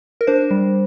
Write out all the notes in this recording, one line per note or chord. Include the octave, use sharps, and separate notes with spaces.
A#4
D4 C5
G3